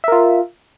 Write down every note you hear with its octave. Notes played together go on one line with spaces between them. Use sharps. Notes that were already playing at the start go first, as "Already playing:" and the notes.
F4 A#4 E5